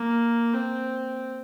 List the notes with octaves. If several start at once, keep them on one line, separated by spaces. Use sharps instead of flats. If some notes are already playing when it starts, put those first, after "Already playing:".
Already playing: A#3
C4